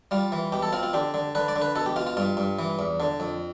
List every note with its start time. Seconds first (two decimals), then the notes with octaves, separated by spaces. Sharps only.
0.11 G3 F4
0.32 E3
0.52 B2 G4
0.63 A4
0.73 C4 F4
0.83 F4
0.93 D3 G4
1.14 D3
1.35 D3 B4
1.48 D5
1.56 D3
1.62 B4
1.76 B2 A4
1.86 G4
1.96 B2 F4
2.07 F4
2.17 G2 F4
2.37 G2
2.59 E3
2.79 E2
3.00 D3
3.20 F2